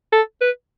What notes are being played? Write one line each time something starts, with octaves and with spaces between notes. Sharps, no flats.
A4
B4